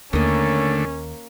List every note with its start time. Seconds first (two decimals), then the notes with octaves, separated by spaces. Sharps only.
0.13 D#2 D3 A3 A#3 C#4 D#5